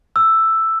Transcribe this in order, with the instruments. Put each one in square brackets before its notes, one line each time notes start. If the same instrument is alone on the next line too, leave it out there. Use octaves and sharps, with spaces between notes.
[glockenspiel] E6